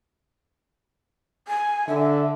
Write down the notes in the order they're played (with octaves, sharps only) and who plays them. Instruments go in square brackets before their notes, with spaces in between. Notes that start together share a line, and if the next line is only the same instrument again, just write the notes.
[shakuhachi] G#5
[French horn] D3 [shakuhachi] E5